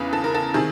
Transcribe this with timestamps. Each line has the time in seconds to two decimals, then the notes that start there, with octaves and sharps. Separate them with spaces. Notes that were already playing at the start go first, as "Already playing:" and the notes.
Already playing: E2 C#3 E3 B4
0.13 A4
0.24 A#4
0.35 A4
0.54 C3 D#3 G#4